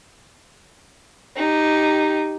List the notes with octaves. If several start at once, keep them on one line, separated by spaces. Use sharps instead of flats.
D#4 G4